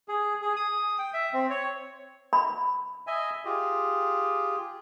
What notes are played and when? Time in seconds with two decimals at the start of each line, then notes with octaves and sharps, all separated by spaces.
0.08 G#4
0.42 G#4
0.56 D#6
0.99 G5
1.14 E5
1.33 C4
1.50 C#5
2.33 B5
3.07 D#5 E5 G#5
3.45 F4 G4 G#4